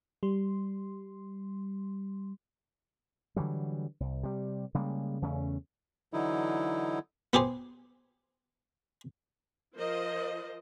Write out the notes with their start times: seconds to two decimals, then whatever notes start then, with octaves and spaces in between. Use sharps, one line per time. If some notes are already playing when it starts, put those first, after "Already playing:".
0.23 G3 C6
3.36 D3 E3 F#3 G3
4.00 C2
4.23 C3 G3
4.74 C#3 G3 G#3 A#3
5.22 E2 C#3 A3 C#4
6.13 D3 E3 F#3 D#4 E4
7.33 B3 G4 G#4 C5
9.77 F3 A#4 C5 D#5